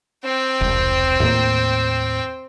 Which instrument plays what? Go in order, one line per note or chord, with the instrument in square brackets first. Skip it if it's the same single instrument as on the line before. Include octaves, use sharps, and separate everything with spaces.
[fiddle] C4 G5
[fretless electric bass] E1 C2
D#2 A2 A#3